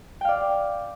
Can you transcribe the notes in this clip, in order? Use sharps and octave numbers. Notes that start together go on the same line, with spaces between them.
D5 F5 G5